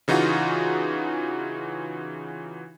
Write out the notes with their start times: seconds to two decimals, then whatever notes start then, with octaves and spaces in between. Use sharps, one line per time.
0.08 C#3 E3 D#4 F4 F#4